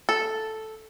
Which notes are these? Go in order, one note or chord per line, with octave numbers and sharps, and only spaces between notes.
A4